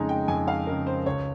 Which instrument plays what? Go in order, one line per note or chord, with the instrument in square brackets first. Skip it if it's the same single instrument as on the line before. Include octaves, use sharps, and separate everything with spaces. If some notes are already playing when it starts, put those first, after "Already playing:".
Already playing: [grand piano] F2 C#3 G#3 D#4 [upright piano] G#5 A#5
[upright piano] G5
[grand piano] F2 [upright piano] G#5
[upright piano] F5
[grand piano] C#3 G#3 D#4 [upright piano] A#4
[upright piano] C5
[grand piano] C#2 [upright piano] C#5